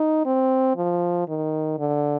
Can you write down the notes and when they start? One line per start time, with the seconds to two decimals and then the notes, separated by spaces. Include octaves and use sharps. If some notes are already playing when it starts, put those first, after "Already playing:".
Already playing: D#4
0.26 C4
0.77 F3
1.28 D#3
1.78 D3